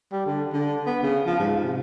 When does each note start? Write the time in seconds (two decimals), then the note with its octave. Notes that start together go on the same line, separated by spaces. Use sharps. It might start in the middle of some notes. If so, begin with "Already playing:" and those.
0.12 G3
0.26 D3
0.53 D3
0.87 B3
1.03 C#3
1.27 F3
1.39 G#2
1.64 C3